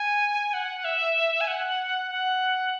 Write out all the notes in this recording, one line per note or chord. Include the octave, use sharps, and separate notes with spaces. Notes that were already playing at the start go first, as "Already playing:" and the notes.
Already playing: G#5
F#5
E5
G#5
F#5
F#5